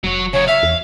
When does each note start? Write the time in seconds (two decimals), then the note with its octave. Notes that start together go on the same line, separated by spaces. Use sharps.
0.04 F1 F#3 C#5
0.33 C#3 F#3 C#5
0.48 E5 F5
0.63 E2